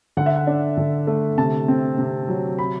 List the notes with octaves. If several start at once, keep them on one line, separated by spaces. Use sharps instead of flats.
D3 F#5
E5
F#5
D4
D3
A3
C3 A5
C4
C3
F#3
B5